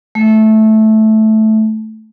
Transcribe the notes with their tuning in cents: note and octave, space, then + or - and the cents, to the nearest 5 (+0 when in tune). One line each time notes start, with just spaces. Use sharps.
A3 -10